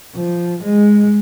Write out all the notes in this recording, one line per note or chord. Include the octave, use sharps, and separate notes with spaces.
F3
G#3